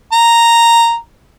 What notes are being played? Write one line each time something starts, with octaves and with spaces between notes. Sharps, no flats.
A#5